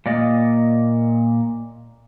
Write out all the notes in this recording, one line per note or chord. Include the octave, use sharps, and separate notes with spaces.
A#2 A#3 D5 D#5